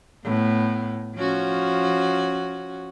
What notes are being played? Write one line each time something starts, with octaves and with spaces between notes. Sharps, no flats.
A2 B3
F3 C#4 F#4